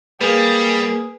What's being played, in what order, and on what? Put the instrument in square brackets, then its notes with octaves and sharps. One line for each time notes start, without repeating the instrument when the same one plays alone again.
[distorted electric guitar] G3 [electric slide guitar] A#3 [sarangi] G#4 [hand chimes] B4